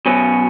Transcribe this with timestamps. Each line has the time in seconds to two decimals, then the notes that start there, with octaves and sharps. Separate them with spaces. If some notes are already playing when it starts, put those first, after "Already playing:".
0.06 B2 F#3 C#4